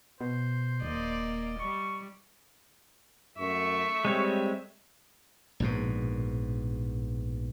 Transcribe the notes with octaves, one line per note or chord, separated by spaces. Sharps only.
B2 C5
D#1 A#3 D5 D#5
G3 C#6
F#2 A3 E5 C#6
G3 G#3 C4 C#5
A#1 G#2 B2